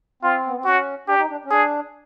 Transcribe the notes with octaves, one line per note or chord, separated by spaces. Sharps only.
C4 F4
B3
C4
C#4 F#4
D4 G4
D#4
D4
C#4
D4 G#4